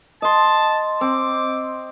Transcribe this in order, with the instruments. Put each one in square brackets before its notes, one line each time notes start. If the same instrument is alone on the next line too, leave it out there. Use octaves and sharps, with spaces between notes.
[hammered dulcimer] D#5 C6 [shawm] A5
[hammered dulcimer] C4 [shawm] D6